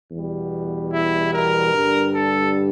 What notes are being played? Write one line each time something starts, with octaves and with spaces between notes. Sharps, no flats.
E2 B2 G3
E4
A#4
G2 D3 G3
A4